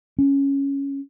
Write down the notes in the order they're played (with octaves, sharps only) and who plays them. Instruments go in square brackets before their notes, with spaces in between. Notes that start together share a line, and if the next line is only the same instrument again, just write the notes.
[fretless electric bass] C#4